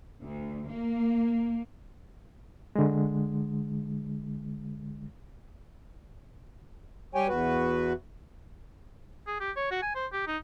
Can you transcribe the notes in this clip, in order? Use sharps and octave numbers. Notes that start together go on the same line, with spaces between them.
D2
A#3
D3 G#3
G3 G4 C#5 G5 G#5
E2 F#4 B4
G#4
G4
C#5
F#4
G#5
C5
G4
D#4